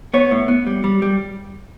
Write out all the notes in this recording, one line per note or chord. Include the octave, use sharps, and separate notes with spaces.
B3 C#5
A2
B3
G3
G3
G3